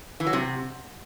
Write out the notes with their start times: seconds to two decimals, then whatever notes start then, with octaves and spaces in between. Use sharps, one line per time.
0.20 E3
0.27 F#3
0.33 C3